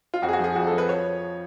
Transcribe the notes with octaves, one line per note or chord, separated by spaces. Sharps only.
F4
F2 F#4
G#4
F#4
F3 G#4
F2 F#4
F3 A4
B4
C#5